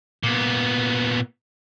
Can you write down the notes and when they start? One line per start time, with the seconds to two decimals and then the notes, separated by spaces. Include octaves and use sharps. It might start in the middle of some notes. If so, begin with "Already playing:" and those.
0.23 A#2 B3